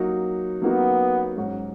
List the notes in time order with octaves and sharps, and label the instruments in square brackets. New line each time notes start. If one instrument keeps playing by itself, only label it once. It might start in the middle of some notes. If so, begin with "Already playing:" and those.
Already playing: [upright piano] F#3 A#3 D#4 F#4
[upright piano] F#3 A#3 D#4 F#4 [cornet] B3
[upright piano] G#2 F#3 C#4 F#4